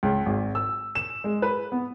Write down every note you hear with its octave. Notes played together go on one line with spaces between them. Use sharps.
C#2
G#1
E6
E7
G#3
B4
B3